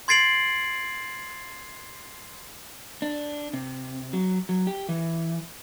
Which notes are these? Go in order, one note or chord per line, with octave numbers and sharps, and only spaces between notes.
C6 G#6 A6 C7 D7 F#7
D4
C3
F#3
F#3
G4
E3